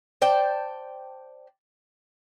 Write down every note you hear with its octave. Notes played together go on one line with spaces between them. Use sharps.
C5 D5 G5 A5